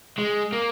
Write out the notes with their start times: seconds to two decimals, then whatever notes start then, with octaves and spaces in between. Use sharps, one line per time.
0.18 G#3
0.53 A#3